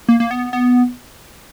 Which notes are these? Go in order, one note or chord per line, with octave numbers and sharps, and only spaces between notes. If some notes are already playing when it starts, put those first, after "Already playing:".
A#3
A#3
B3
B3